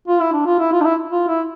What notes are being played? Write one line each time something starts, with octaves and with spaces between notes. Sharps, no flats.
F4
E4
D4
F4
E4
F4
D4
E4
F4
E4